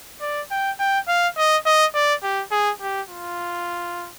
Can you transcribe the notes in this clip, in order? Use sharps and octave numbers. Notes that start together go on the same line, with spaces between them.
D5
G5
G5
F5
D#5
D#5
D5
G4
G#4
G4
F4